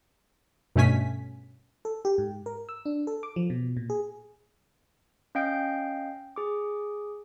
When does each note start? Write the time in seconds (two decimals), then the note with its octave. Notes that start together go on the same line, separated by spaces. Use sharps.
0.76 G2 B2 A3 C#4 G#5 B6
1.85 A4
2.05 G4
2.18 G#2
2.46 A#4
2.69 E6
2.86 D4
3.07 A4
3.23 D6
3.36 F3
3.50 B2
3.77 A#2
3.90 G#4
5.35 C#4 D#5 F5 G5 G6 D7
6.36 G#4 D6